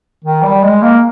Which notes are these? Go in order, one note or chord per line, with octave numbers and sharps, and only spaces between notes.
D#3
G3
G#3
A#3